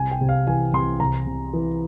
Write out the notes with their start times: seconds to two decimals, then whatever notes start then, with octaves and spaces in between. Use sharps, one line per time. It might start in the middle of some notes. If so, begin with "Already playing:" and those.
Already playing: C2 G#5
0.11 G5
0.21 C3
0.29 F5
0.47 E3 G#5
0.73 C2 C6
1.00 C2 A#5
1.27 C3
1.53 E3